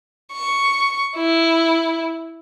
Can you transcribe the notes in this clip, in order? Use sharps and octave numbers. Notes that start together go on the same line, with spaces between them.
C#6
E4